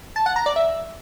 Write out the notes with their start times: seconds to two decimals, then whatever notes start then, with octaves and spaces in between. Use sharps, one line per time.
0.16 A5
0.26 F#5
0.36 A#5
0.46 D5
0.56 E5